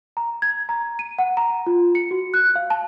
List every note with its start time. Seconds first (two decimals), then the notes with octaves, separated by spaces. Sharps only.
0.17 A#5
0.42 G#6
0.69 A#5
0.99 D#7
1.19 F#5
1.37 A#5
1.67 F4
1.95 C#7
2.11 F#4
2.34 F#6
2.56 F5
2.70 A5